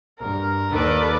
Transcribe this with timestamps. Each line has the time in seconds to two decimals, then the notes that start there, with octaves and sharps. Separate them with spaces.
0.20 G2 A#4
0.71 D#2 D#3 A4 B4 D5